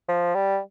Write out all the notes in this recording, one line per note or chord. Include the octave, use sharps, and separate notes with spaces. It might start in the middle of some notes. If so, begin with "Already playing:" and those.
F3
G3